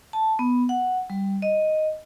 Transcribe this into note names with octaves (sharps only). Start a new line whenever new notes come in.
A5
B3
F#5
G3
D#5